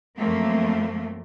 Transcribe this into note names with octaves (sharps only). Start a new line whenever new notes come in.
F#2 F3 A3 A#3 C4